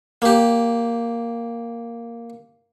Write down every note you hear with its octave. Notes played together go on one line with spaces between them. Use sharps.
A#3 G4